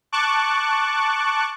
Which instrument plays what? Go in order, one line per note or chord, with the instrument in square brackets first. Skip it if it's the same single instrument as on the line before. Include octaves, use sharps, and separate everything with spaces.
[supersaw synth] A5 C#6 D6 F#6